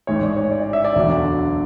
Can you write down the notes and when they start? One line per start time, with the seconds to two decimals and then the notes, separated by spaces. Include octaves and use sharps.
0.07 A1 G#2 E3 G#3 C#5
0.23 D5
0.37 C#5
0.51 D5
0.62 D5
0.73 E5
0.84 D5
0.95 E1 D2 D3 F#3